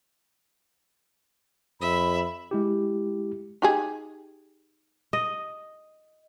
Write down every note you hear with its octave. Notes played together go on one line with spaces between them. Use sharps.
F2 E5 B5
G#3 E4 G4
D#4 G4 G#4
D#5